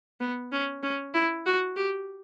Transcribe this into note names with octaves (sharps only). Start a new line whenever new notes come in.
B3
C#4
C#4
E4
F#4
G4